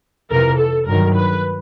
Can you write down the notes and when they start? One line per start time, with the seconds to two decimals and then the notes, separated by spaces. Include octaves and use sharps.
0.30 F2 C3 E3 A#4
0.59 A4
0.87 G2 D#3 F#3 A#4
1.15 B4